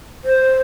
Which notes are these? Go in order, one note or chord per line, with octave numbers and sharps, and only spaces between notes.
C5